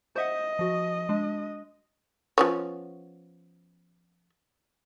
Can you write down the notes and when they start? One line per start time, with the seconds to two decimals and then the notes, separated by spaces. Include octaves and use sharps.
0.16 C5 D#5 E5 F#5
0.59 F3 F#4
1.09 G#3 D4
2.38 F3 B3 C#4